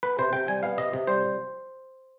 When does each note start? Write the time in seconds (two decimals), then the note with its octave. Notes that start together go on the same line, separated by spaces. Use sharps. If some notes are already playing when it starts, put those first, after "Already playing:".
0.03 B3 B4
0.19 C3 C5
0.33 C3 G5
0.48 G3 G#5
0.63 B3 F5
0.78 C3 D#5
0.93 C3
1.07 G3 C5